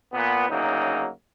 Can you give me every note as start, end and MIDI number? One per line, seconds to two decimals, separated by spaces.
0.13 0.46 46
0.13 0.46 59
0.49 1.07 38
0.49 1.07 49
0.49 1.07 54
0.49 1.07 58
0.49 1.07 63